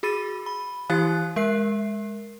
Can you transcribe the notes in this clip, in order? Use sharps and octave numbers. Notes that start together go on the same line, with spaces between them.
F#4 G#4 B5 A6 D#7
B5
E3 E4 G4 F5 F#6 A6
G#3 A#4 E5 C7